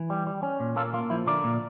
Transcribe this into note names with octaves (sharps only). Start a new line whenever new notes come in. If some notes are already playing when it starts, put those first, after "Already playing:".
Already playing: E3
G3
G3
C#4
A#2
A#3 F4 A4
A#3 F4
F3 E4
D3 A#4 D5
A#2